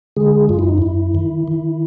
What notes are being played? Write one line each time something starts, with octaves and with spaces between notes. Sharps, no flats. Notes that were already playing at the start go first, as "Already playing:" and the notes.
D3 G#3 G#4
F#2 F4
E4
D#4
F#2 E4
D#3
D#3